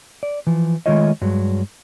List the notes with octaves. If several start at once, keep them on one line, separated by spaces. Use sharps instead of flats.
D5
E3 F3
D#3 G#3 A3 F4 C#5 D#5
G2 F#3 G#3